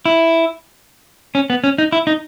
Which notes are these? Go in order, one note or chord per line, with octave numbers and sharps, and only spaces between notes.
E4
C#4
B3
C#4
D#4
E4
D#4